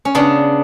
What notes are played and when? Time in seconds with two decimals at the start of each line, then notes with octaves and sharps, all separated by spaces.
0.05 C#4
0.15 C#3 B3 D4